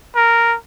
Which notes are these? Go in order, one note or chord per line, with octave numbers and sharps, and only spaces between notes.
A#4